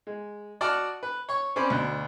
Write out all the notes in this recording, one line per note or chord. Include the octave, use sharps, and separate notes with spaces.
G#3
F#4 D5 D#5 F#5 A5 F6
B4
C#5 C#6
C4 C#4 C5 D5 B5
D2 B2 D4